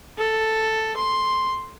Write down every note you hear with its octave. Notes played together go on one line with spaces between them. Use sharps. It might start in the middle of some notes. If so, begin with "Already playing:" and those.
A4
C6